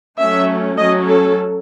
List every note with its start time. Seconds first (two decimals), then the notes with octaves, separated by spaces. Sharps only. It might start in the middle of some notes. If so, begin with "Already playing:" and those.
0.20 F#3 A3 C#4 E5
0.77 F#3 A3 C#4 D#5
1.07 A4